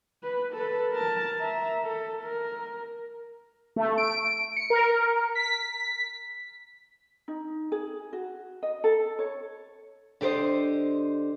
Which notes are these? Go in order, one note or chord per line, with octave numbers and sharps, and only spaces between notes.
B4
A4 B4
A#4 A5
E5 A#5
A4
A#4
A3
D7
C#7
A#4
B6
D#4
G#4
F#4
D#5
A4
C#5
D3 G4 A#4 C5 D#5